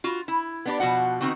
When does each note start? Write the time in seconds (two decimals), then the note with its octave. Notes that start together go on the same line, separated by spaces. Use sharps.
0.04 F4 F#4
0.28 E4
0.66 B3 D4 G4
0.80 B2 F3 F#4 F#5
1.21 D#3 B3 C4 D#4 F#4